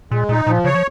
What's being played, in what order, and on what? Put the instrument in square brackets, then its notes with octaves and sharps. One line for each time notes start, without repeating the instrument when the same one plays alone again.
[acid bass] A#2 [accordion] G#3
[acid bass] A#2 [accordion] D#4
[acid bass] A#2 [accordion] F3
[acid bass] C#3 [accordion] C#5
[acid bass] F3